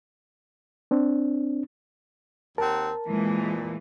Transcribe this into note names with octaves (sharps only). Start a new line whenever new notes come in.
C4 D4
D#2 C4 A#4 F#5 A5
F2 A#2 E3 G#3 A#3